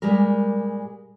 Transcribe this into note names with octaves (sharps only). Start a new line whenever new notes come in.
A#2 G3 G#3 G4 A#4